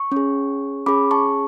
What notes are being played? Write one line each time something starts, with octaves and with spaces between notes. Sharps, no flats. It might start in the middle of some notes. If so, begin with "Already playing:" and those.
Already playing: C#6
C#4 G#4
C#4 G#4 B5 D6
A5 C#6